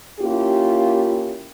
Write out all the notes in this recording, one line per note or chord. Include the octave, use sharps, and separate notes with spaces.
A#3 C#4 E4 F4 G4